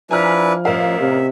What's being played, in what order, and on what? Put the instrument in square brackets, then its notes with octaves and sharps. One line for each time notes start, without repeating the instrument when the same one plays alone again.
[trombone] F3 [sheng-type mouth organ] D4 E4 B4 [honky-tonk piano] G#5 A#5 F6
[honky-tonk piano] A1 A#4 F5 [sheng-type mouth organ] E5
[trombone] C3